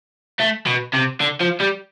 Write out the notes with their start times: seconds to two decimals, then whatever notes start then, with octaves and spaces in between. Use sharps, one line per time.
0.40 A3
0.67 B2
0.94 C3
1.21 D3
1.41 F3
1.61 G3